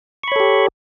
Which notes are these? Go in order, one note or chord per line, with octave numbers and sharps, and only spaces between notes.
G4 A4 C#5 B5 C#6